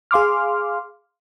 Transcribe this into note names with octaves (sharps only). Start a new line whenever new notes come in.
G#4 F5 C6 D6 F6